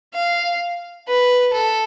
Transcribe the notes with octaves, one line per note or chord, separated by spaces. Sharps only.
F5
B4
A4